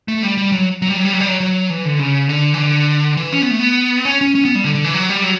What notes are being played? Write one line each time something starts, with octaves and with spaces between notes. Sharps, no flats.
A3
G3
G3
F#3
F#3
G3
F#3
G3
F#3
G3
F#3
F#3
E3
D3
C#3
D3
E3
D3
E3
C#4
B3
A3
B3
C#4
C#4
C#4
B3
G3
D3
D3
E3
F#3
G3
F#3